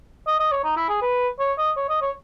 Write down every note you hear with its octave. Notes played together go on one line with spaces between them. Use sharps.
D#5
D#5
C#5
D#4
E4
G#4
B4
C#5
D#5
C#5
D#5
C#5